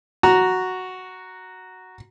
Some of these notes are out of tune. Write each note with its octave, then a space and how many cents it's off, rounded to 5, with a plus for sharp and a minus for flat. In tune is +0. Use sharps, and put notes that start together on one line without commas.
F#4 +0 A#5 +0